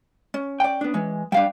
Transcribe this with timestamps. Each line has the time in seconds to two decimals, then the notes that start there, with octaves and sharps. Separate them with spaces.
0.34 C#4
0.60 D5 G5
0.81 B3 D4
0.94 E3 G#3
1.32 G3 D4 F5 G5